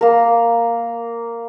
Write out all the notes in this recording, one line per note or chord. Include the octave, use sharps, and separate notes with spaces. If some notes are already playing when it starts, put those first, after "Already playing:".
A#3 A#4